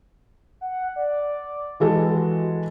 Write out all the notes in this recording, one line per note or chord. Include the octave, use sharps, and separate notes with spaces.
F#5
D5
E3 G#3 F#4 A4